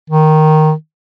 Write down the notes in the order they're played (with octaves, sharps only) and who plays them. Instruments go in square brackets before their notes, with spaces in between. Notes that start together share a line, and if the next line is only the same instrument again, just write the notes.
[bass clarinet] D#3